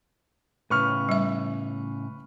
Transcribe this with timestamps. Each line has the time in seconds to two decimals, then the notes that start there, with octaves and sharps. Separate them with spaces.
0.70 A2 C#3 B4 C#6 F6
1.09 G3 E5